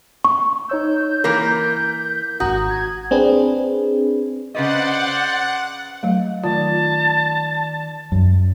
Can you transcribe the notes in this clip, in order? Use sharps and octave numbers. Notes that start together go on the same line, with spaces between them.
C#6
D#4 C#5 E6 G6
E3 A#3 A#4 B6
G#1 F#4 A#5 D#6
G#6
C4 D4 G#4 B4
C#3 B4 C5 D5 D#5 F#5
F#3 A3
D#3 F4 D5 A5
F#2